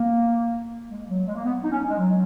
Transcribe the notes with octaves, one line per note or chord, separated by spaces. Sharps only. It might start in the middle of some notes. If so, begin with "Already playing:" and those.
Already playing: A#3
G#3
F#3
G#3
A#3
B3
D#4
C#4
G#3
F#3